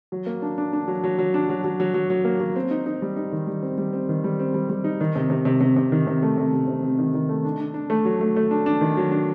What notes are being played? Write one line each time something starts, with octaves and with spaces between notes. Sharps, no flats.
F#3
A#3
D4
D4
D4
F#3
F#3
F#3
D4
F#3
F#3
F#3
F#3
F#3
A#3
F#3
C4
D#4
D#4
G3
D#4
D#3
G3
C4
G3
C4
D#3
G3
C4
G3
G3
D#4
D#3
C3
C3
C3
C3
C3
D#3
C3
A3
C3
C3
C3
C3
D#3
D#3
A3
D4
D4
D4
A3
F#3
A3
A3
D4
D4
D#3
F#3
D4